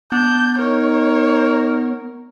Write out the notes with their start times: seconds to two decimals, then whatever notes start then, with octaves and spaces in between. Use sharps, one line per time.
0.12 B3 D4 G6
0.59 D#4 A#4 C#5